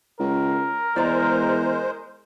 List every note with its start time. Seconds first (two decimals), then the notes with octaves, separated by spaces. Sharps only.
0.20 C#2 A#4
0.96 E2 G#3 C5 D5 A#5